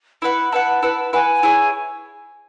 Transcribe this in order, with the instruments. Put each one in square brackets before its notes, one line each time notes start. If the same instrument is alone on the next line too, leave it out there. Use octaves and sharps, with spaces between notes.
[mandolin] E4 B4 F#5 [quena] B5
[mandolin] E4 B4 F#5 [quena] A5
[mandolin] E4 B4 F#5
[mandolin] E4 B4 F#5 [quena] G#5
[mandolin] E4 G#4 C#5